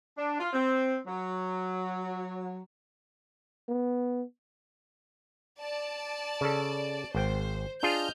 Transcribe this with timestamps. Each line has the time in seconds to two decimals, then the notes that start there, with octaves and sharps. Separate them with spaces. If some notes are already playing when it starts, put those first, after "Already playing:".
0.17 D4
0.39 F4
0.53 C4
1.06 F#3
3.69 B3
5.61 D5 A5
6.41 C#3 A4
7.15 G#1 C5 G5
7.83 D4 F4 G#4 D#5 F6 G6